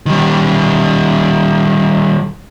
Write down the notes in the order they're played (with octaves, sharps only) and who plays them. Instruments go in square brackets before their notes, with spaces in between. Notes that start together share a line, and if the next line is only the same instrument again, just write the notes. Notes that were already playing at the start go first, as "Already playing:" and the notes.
[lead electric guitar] D#3 G3